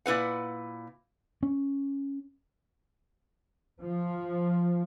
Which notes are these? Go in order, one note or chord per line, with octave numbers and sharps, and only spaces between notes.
A#2 E4 B4 F#5
C#4
F3